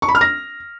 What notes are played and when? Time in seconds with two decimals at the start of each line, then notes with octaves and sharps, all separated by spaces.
0.02 C#6
0.08 B5
0.15 F6
0.21 A#6